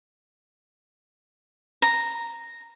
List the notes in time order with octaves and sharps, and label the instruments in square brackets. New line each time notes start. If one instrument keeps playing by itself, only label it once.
[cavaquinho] A#5